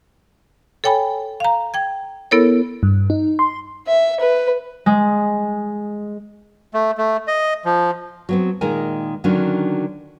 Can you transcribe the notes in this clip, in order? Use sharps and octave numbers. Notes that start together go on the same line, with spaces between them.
A4 C#5 G5 G#5 B5
F5 A#5
G5 G#6
B3 E4 A4 A#4 C#5
G2
D#4
C6
E5
B4
G#3
A3
A3
D#5
F3
F#3 B3 C4
A#2 D#3 G#3 G#4 A#4 G#5
D3 D#3 F#3 C#4 D4